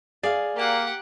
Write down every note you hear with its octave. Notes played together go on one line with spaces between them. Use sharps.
G#4 D5 F5
A#3 G4 F#5